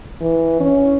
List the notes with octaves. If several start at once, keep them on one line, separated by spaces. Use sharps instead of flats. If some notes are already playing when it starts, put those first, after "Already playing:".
E3
C#4